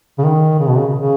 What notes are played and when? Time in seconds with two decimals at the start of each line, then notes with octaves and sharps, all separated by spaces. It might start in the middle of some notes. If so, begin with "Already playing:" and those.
0.19 C#3
0.24 D#3
0.59 C#3
0.68 B2
0.77 C#3
0.95 C#3